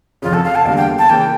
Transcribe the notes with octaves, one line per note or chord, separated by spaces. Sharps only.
F1 F2 C#3 F4
A4
F5
A5
E2 D3 G3 A#3 F5
G5
A5
C#3 E3 A#3 G5